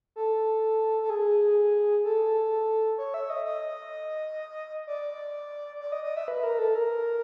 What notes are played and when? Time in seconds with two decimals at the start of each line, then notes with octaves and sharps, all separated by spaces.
0.16 A4
1.02 A4
1.10 G#4
2.04 A4
2.98 C#5
3.14 E5
3.30 D#5
3.45 D#5
4.87 D5
5.80 D5
5.92 D#5
6.04 D#5
6.16 E5
6.28 B4
6.43 A#4
6.59 A4
6.75 A#4